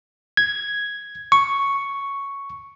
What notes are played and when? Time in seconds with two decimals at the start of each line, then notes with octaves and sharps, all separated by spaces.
0.37 G#6
1.32 C#6